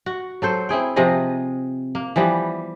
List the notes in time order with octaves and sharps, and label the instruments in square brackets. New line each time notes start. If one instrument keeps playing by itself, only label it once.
[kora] F#4
F#3 A4 C5
C4 E4 G#4 G5
C3 F3 G#4 D#5
A#3
E3 F3 G3 B3